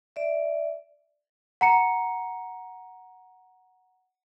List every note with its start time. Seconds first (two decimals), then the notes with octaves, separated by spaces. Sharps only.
0.16 D5 E5
1.61 F#5 A#5 C#7